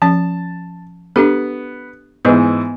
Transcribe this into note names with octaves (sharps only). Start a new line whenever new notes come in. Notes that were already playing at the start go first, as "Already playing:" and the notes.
F3 C#4 A5
B3 D4 G4 A4
G#2 E3 B3 B4 D#5